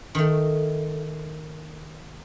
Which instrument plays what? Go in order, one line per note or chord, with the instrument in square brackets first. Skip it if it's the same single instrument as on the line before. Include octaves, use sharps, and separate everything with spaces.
[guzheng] D#3 A3